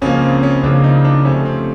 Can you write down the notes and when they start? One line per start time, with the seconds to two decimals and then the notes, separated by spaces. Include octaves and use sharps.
0.02 C#2 C#3 F3 A#3 C#4
0.22 C4
0.43 C#4
0.63 C#2 C#3 F3 A#3 D4
0.84 D#4
1.05 D4
1.25 F2 C3 F3 A3 C#4
1.45 C4